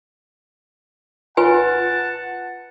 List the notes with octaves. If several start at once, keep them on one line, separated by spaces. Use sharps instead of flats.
F4 B4 F#5 G#5 A5